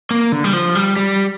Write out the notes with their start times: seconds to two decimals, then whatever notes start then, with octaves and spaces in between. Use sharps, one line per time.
0.11 A#3
0.32 D3
0.44 G3
0.53 F3
0.75 G3
0.97 G3